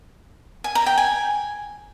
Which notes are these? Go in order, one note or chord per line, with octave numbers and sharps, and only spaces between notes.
G#5
A#5
G5
G#5